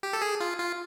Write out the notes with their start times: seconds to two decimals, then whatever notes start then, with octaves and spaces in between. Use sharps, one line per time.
0.03 G4
0.13 A4
0.22 G#4
0.40 F4
0.59 F4